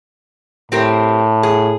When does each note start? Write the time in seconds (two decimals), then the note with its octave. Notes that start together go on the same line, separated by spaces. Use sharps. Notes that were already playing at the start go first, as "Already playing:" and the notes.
0.72 A2 C4 G4 A#4
1.43 G#4